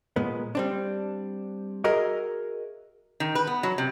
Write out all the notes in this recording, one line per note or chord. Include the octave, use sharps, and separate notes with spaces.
A#2 G#3 B3
G3 C4 D4
F#4 G#4 A#4 D#5 E5
D#3
B4
B3
F#3
C3